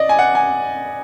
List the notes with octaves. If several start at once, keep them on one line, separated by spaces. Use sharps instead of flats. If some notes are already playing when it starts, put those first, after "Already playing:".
Already playing: D5 D#5
G#5
F#5
G#5